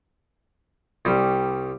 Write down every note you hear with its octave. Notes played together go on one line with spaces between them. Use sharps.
C2 G3